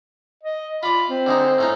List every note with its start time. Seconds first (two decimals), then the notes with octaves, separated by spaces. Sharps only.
0.43 D#5
0.83 F4 D5 B5
1.10 C4
1.26 D3 G#3 D#4
1.58 A2 C#4 D#4